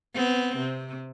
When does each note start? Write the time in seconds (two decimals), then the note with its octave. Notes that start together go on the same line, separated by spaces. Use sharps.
0.15 B3 C4
0.57 C3